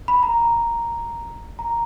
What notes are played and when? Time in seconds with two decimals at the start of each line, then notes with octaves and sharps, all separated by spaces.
0.08 B5
0.23 A#5
1.59 A#5